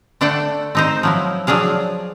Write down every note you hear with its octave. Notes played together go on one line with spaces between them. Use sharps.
D3 A3 D4 A4 F#5 G5
C4 D#4 C5
F3 F#3 E4
F3 F#3 D4 G#4 F5